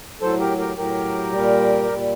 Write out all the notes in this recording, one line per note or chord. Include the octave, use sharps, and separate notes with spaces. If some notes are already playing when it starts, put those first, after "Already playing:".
A2 F#3 A4 C5
G4 A#4
G4 A#4
A2 F#3 G4 A#4
A#2 G3
A#2 G3